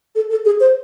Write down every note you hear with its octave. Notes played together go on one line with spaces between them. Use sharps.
A4
A4
G#4
C5